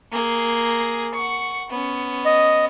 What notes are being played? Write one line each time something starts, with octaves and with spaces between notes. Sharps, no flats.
A#3 G#4
F#5 C#6
B3 C#4
D#5